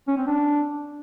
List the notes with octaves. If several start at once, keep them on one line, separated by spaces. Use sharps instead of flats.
C#4
C4
D4